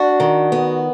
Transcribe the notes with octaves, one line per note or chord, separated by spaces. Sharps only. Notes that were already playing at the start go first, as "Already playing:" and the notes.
Already playing: D4 F#4
D#3
B3